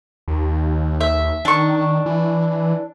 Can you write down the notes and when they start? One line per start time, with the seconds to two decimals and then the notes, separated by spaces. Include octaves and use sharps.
0.28 D#2
1.01 E5
1.45 D#3 D4 C#6
2.06 E3